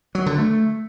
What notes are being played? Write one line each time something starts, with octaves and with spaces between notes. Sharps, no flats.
F#3
D3
A3